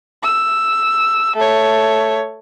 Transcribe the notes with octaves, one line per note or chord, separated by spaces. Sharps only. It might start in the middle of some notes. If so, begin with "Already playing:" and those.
E6
A3 C#5